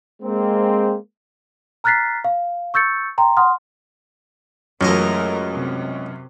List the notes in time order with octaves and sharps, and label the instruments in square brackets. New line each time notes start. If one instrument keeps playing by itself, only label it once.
[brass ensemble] G#3 A#3 C4
[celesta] A#5 F6 F#6 A6 B6 C7
F5
C#6 E6 G6 A6 C#7
G5 A#5 C6
F#5 C6 D#6 F6
[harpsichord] C#2 G#3 D#5 [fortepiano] F#2 [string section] E3 A3 A#4
[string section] C3